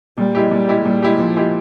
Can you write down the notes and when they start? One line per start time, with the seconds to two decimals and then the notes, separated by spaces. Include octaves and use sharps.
0.18 A#2 G3
0.35 G#3 E4 G4
0.51 A#2 G3
0.68 G#3 E4 G4
0.85 A#2 G3
1.03 G#3 E4 G4
1.19 A#2 F3
1.36 G#3 E4 G4